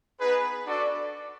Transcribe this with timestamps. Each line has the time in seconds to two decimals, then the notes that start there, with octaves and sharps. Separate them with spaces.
0.19 B3 D#4 G#4 B4
0.67 D4 F#4 A4 D5